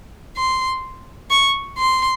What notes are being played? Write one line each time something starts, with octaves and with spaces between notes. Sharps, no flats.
C6
C#6
C6